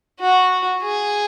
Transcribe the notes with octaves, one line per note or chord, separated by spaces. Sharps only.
F#4
G#4